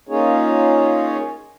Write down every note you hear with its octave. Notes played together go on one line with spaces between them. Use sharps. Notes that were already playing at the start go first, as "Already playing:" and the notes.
A#3 C#4 D#4 F4 G#4 C#5